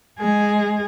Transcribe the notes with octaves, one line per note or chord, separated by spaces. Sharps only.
G#3 G#4